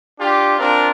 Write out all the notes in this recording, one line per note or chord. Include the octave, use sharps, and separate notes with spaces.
D4 F4 G4
C4 D4 F4 A#4